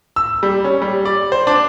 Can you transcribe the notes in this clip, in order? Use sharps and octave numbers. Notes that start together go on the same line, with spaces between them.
E6
G3
C#4
G3
D5
C5
D4